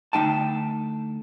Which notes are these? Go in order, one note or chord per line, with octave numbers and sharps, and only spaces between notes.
D2 F#3 D#4 G5 A5